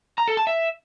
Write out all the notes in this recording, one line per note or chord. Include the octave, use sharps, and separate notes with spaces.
A#5
A4
A5
E5